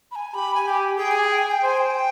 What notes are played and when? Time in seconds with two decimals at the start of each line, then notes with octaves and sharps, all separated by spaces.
0.11 B5
0.16 G#5
0.34 G4 B5
0.55 G#5
0.66 G4
0.98 G#4 G5
1.11 G#5
1.24 G5
1.38 G#5
1.51 G5
1.63 C5 G#5
1.78 G5